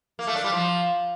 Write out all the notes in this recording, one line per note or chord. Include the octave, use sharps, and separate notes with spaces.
A#3
A3
D4
G3
F3